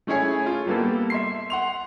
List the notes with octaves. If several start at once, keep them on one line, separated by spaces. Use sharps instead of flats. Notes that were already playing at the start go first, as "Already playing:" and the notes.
A3 C#4 E4 G#4 C#5 G#5
F4
G3 A#3 B3 G4 A4
E5 C6 C7
F#5 C6 F7